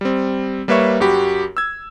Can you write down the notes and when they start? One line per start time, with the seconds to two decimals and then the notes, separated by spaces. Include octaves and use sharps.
0.01 G3 C4
0.68 G3 A#3 B4 C#5 E5 C#6
1.00 F#2 F#4 G4 B5
1.57 E6 G#6